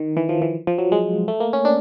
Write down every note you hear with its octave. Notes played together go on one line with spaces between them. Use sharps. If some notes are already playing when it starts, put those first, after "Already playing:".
Already playing: D#3
E3
F3
E3
F3
F#3
G#3
A3
A#3
C#4
D4